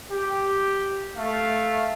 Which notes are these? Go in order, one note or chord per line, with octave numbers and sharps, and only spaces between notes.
G4
A3 F5